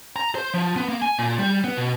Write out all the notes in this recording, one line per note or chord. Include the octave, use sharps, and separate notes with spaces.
A#5
C5
F3
B3
A#3
G#5
A#2
G3
B3
B2